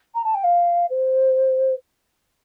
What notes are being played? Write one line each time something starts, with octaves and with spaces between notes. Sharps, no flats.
A#5
A5
G5
F5
C5